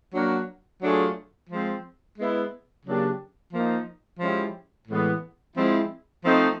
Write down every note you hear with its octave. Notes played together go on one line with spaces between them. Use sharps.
F#3 A#3 D4 F#4
F#3 A3 D4 F4 G#4
F3 G#3 C4
G#3 B3 E4
C#3 F#3 A#3 D4 G4
F3 A#3 D#4
F3 G#3 C#4 E4 G4
A2 E3 G#3 B3
F3 G#3 C4 E4
F3 A3 C4 D#4